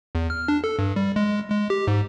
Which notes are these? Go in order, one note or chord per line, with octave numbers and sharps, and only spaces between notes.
E2
F6
D4
A4
G2
G3
G#3
G#3
G4
G#2